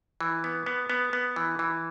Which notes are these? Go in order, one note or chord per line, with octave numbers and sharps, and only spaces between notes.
E3
B3
B3
B3
B3
E3
E3